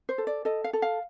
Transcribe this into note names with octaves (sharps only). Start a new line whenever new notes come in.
C5
A4
D5
A4 D#5
F5
A4
F5